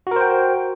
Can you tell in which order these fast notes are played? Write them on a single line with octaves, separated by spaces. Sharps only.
F#4 A#4 C5 G5